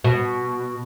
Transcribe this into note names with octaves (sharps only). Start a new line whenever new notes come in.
B2